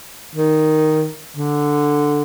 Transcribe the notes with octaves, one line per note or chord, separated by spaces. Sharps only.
D#3
D3